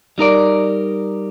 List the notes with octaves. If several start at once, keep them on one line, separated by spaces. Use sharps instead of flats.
G3 D#4 A#4 D5